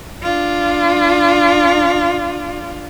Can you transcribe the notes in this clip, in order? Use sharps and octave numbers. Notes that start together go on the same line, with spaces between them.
D4 F4